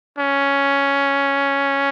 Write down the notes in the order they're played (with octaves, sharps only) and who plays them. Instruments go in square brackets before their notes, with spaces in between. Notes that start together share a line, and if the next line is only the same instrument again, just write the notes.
[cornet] C#4